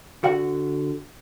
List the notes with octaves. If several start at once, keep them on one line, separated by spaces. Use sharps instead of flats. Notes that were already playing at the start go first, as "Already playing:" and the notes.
D3 F#4 F#5